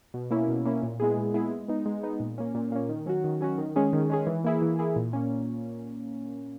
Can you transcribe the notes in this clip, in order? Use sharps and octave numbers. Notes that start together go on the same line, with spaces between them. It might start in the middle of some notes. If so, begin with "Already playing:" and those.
B2
A#3 C#4 E4
B2
A#3 C#4 E4
A#2
G#3 B3 E4 G#4
A#2
G#3 B3 E4 G#4
G#3
B3 D#4
G#3
B3 D#4
A#2
A#3 C#4
A#2
A#3 C#4
D#3
F#3 C#4 F#4
D#3
F#3 C#4 F#4
D#3
G#3 C#4 G#4
D#3
G#3 C#4 G#4
E3
A#3 E4 G#4
E3
A#3 E4 G#4
A#2
A#3 C#4